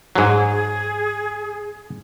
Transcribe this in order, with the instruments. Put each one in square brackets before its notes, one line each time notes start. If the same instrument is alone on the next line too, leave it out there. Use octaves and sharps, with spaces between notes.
[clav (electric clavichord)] G#2 F#3 [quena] G#4